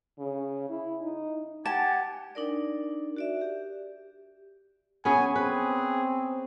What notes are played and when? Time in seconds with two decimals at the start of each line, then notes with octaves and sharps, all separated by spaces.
0.19 C#3
0.69 E4
1.02 D#4
1.66 G4 F#5 G#5 A5 G#6
2.35 D4 D#4 A#4 D5
3.16 F#4 D5 E5
3.41 G4
5.05 B3 C#4 G#4 G#5
5.36 C4 G#4 B4